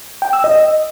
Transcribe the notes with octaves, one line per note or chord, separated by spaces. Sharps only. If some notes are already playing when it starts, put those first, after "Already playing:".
G5
E6
D#5